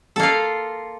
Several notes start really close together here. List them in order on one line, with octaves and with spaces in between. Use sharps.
A4 A#3 F4